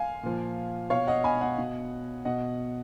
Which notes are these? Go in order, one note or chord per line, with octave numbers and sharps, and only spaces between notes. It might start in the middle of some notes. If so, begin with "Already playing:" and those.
Already playing: F5 G#5
A#2 F3
B2 C#5 F5
D#5 F#5
G#5 B5
D#5 F#5
B2
B2 D#5 F#5